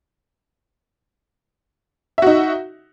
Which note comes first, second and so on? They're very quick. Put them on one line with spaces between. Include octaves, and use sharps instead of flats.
E5 F#4 D#4